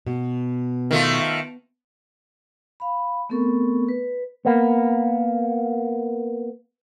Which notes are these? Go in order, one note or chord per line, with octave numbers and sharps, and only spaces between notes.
B2
D#3 A3 F4
F5 B5
A3 B3 C4 A4 A#4 C#6
B4
A#3 B3